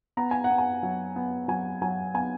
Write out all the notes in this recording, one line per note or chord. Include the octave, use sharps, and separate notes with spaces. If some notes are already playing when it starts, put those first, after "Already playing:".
B3 A#5
G#5
F#5
B3
G#5
F#3
B3
F#3 G#5
F#3 G#5
B3 G#5